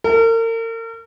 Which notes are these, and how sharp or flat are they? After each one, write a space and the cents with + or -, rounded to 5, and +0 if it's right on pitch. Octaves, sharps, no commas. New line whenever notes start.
A#4 -40